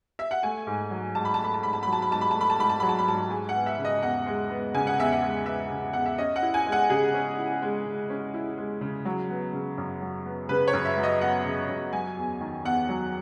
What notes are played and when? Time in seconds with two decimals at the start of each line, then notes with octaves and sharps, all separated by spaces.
0.19 E5
0.31 F#5
0.43 A3 G#5
0.67 G#2
0.91 F#3
1.15 G#2 A5
1.25 B5
1.34 A5
1.40 A3 B5
1.54 A5
1.63 G#2 B5
1.73 A5
1.83 F#3 B5
1.93 A5
2.02 B5
2.11 G#2 A5
2.21 B5
2.31 A3 A5
2.41 B5
2.50 A5
2.59 G#2 B5
2.70 A5
2.80 F#3 B5
2.89 A5
2.98 B5
3.07 G#2 A5
3.31 G#3 G#5
3.49 F#5
3.55 B3
3.66 E5
3.78 C#3
3.85 D#5
4.02 E2 F#5
4.26 G#3
4.50 B3
4.74 C#3 G#5
4.87 F#5
4.98 E2 E5
5.12 F#5
5.22 G#3
5.46 B3 E5
5.70 C#3
5.93 E2 F#5
6.06 E5
6.18 C#4 D#5
6.36 F#5
6.42 E4
6.54 G#5
6.66 G#3
6.72 F#5
6.90 C#3 G#4
7.14 C#4
7.38 E4
7.62 G#3
7.86 C#3
8.10 C#4
8.34 E4
8.58 G#3
8.81 C#3
9.05 F#3
9.30 B3
9.53 C#3
9.78 F#2
10.02 F#3
10.26 B3
10.49 C#3 B4
10.68 C#5
10.73 F#2
10.85 E5
10.97 F#3
11.03 D#5
11.21 B3 F#5
11.45 C#3
11.69 F#2
11.93 F#3 G#5
12.17 E2
12.41 D#3
12.65 E2 F#5
12.89 F#3